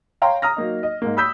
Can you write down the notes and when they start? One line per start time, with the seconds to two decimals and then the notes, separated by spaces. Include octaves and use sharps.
0.22 C#5 F5 G5 A#5 C6
0.42 A#5 D#6 F6 A#6
0.57 F#3 A#3 D#4
0.83 D#5
1.02 G#2 A#3
1.17 B5 D#6 E6 G6 B6